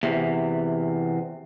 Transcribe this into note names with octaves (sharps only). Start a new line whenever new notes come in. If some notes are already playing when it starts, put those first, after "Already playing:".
E2 C3